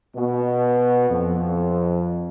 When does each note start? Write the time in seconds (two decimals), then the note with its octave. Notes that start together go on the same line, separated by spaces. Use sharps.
0.16 B2
1.10 F2